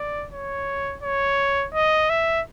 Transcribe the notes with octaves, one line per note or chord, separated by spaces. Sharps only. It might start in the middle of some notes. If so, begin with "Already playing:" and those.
Already playing: D5
C#5
C#5
D#5
E5